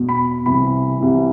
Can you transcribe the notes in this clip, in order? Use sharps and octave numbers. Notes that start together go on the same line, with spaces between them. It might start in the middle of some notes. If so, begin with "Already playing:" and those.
Already playing: E2 B2
B5
C2 C3 E3 B5
C2 C3 E3